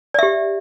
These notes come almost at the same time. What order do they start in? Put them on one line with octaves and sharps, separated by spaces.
D5 E5 G4